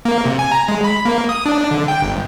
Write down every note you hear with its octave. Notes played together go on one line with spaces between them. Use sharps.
A#3
C3
G#5
A#5
G#3
B5
A#3
D#6
D4
D3
G5
G1